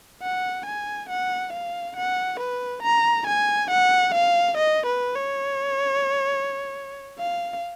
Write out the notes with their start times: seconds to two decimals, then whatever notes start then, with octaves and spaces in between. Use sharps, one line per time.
0.22 F#5
0.66 G#5
1.09 F#5
1.53 F5
1.97 F#5
2.40 B4
2.83 A#5
3.27 G#5
3.71 F#5
4.14 F5
4.58 D#5
4.86 B4
5.16 C#5
7.19 F5